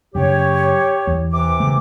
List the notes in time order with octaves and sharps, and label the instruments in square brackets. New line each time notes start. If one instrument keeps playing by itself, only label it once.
[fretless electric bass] F#2 C#3 [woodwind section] G4 C#5
[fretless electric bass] E2
[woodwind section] C3 E3 D6
[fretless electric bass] C#3 A3